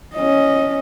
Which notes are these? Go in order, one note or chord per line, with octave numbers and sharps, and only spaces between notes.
C#4 D#5